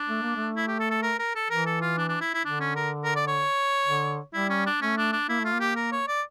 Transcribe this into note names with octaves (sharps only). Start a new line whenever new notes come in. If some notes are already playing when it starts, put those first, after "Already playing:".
Already playing: D4
A3
A#3
A3
E4
G4
A4
A4
A#4
A#4
A4
E3 A#4
A4
F4
D4
D4
E4
E4
D3 D4
C#4
A#4
A#4
D5
C#5
D3
G3 E4
C#4
D4
A3 C#4
D4
D4
A#3 E4
A3 F4
A#3
G4
A#4
C#5
D5